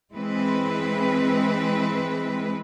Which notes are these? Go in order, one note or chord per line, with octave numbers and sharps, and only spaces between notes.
E3 G#3 C4 B4